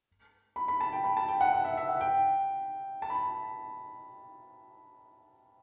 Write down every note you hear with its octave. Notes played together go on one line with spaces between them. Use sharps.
B5
B5
A5
G5
B5
A5
G5
F#5
F#5
E5
E5
F#5
G5
A5
B5